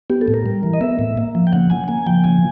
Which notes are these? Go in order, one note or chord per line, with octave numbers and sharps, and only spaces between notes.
B3 G4
A4
A2
A#4
G3
E3
D#5
B3 E5
A2
A#3
F3
G5
C#3 F#5
C#3 G#5
A#3 G#5
F3 G5
C#3 G#5